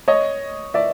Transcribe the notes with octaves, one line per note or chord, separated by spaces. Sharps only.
C#5 D#5
D5 E5